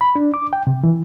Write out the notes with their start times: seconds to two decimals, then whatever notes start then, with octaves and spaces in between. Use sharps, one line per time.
0.01 B5
0.16 D4
0.34 D6
0.53 G5
0.67 C3
0.84 E3